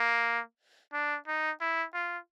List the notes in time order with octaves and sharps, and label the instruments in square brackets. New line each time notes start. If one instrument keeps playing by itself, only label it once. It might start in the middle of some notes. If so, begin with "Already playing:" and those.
Already playing: [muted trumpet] A#3
D4
D#4
E4
F4